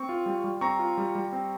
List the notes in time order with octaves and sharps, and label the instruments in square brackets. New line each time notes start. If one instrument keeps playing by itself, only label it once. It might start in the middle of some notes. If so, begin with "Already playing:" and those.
Already playing: [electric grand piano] C4 C#6
F4
G3
G3
C4 A#5 C#6
F4
G3
G3
C4